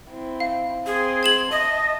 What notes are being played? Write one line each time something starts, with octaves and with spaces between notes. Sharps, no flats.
C4 E4
F5
C4 G#4 C6
G#6 E7 F#7
D#5 E5 A5